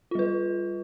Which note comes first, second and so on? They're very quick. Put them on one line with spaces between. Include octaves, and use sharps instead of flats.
F4 G3 B4